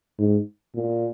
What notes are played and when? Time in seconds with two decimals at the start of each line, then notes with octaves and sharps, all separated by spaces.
0.19 G#2
0.75 A#2